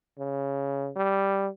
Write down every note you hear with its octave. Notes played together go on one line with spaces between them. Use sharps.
C#3
G3